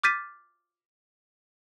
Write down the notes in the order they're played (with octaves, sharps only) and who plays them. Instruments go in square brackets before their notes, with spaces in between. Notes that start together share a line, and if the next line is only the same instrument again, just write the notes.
[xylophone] D6 F6 G6 A6 B6 D#7